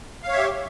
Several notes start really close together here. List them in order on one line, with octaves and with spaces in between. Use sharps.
F5 C#5 E5 G4